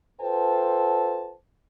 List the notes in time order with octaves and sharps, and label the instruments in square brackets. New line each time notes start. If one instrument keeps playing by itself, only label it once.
[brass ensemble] F4 A4 B4 C5 G5 A5